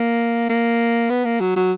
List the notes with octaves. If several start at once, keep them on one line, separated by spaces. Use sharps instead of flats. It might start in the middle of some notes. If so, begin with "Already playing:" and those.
Already playing: A#3
A#3
B3
A#3
F#3
F#3